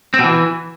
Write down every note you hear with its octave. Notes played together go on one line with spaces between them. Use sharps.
C4
B2
E3